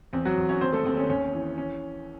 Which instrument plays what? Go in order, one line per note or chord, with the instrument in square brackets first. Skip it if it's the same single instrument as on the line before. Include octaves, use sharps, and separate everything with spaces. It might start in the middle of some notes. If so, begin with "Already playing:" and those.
[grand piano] E2 C4
F#3 F#4
E2
C#4 C#5
D#2 C4 C5
A3 A4
D#2 C4
C#4
D#2 C#4
E3
C#4